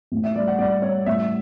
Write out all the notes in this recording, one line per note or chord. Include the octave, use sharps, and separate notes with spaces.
A1
E5
G3 D5
F#5
G3 D5
G3 C#5
A1 E5